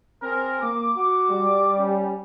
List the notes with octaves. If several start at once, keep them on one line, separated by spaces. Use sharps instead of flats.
C4 G#4 A#4
A#3 D6
F#4
G3
C#4